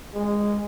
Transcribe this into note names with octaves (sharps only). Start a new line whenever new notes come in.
G#3